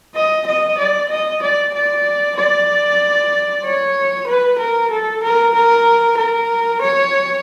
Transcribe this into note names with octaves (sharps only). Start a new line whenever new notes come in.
D#5
D#5
D5
D#5
D5
D5
D5
C#5
B4
A#4
A4
A#4
A#4
A#4
C#5